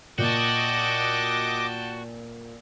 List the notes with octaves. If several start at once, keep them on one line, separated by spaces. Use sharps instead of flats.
A#2 F#4 D#5 G5 A5 D6